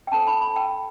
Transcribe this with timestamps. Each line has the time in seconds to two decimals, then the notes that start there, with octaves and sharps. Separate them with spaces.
0.07 G5
0.12 D4 A4 C5 A5
0.27 B5
0.42 B5
0.56 G5